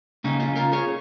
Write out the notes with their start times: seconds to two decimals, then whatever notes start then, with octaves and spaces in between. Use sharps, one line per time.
0.24 C#3 A#3 C#4 D#4
0.40 C#4 F4
0.56 F4 A#4
0.73 G#4 C#5